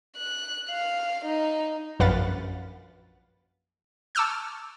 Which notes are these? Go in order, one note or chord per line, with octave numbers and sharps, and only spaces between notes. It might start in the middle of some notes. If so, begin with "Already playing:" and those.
F#6
F5
D#4
A#1 F#2 B4 F5 F#5 A6
A5 C#6 D6 E6 F6 G6